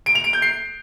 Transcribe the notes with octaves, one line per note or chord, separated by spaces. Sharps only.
D7
F7
D7
G6
C7